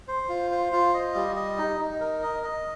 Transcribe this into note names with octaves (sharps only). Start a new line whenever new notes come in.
C5
F4
C5
F4
D#5
G3
D#5
D#4
D#4
A#4
D#5
D#5